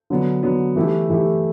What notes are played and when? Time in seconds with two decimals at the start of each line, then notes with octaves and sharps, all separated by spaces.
0.10 D3 F#3 B3
0.43 D3 F#3 B3
0.76 E3 A3 E4 G4
1.10 E3 A3 E4 G4